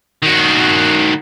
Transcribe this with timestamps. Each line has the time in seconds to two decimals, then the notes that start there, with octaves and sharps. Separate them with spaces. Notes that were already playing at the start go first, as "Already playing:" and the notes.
0.23 D#3 F#4